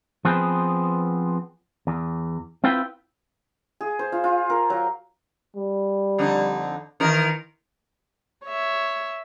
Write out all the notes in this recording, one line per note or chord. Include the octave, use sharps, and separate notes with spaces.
F3 B3 C4 G#4 B4 C5
E2
C4 E4 F4 B4 G5
G#4
C5
F4
F4
A#4
F#3
G3
F2 D3 D#4
D#3 E3 A#4
C#5 E5